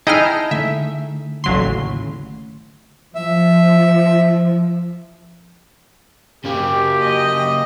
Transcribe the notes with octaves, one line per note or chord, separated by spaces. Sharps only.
D#4 E4 G#4 D#5 G5 A5 F6
D3 A3 E5
A1 D#2 A2 C#3 F#3 C6
F3 E5
C#3 A#3 G4
D#5